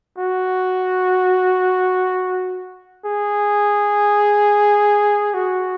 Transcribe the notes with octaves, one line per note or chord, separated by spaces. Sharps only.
F#4
G#4
F#4